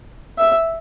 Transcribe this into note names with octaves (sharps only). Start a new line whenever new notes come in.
E5